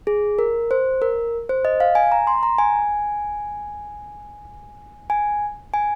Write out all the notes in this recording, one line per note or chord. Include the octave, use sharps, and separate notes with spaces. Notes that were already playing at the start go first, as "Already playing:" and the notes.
G#4
A#4
C5
A#4
C5
D#5
F5
G#5
A#5
C6
A#5
G#5
G#5
G#5